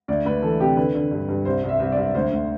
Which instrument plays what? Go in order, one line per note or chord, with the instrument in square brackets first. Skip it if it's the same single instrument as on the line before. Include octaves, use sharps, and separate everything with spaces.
[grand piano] D2 D5
D2 B4
E3 A4
C3 G4
D3 B4
D3
G2
G2
C2 C5
C2
E5
C2
C2 D5
D2 C5
D2